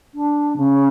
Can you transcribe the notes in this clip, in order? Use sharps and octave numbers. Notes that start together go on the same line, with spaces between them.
D4
C#3